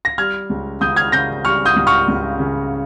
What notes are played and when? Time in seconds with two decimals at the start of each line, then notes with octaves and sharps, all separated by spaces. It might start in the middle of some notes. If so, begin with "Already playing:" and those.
0.05 A#6
0.18 G3 F6 G#6
0.50 C#2
0.81 C#2 D#6 G6
0.96 F6 G#6
1.12 C#3 G6 A#6
1.45 G3 C#6 F6
1.65 D#6 G6
1.76 C#2
1.87 C#6 F6
2.08 C#2
2.39 C#3